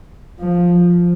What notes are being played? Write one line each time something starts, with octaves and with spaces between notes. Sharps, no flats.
F3